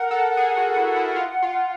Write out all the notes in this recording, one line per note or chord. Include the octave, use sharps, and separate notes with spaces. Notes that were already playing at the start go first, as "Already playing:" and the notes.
Already playing: A#4 F#5
A4
G#4
F#4
E4
E4
F4
F4